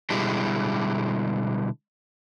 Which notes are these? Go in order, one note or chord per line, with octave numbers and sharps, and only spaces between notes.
B2 D3 G3 G#3 E4 G4